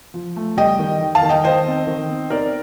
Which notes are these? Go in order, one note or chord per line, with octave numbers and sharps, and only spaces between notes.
F3
A3
G3 D#5 G5
D#3
D#3
F5 A5
D#3
D#5 G5
D#3 C5 D#5
C4
D#3
C4
D#4 A#4 D5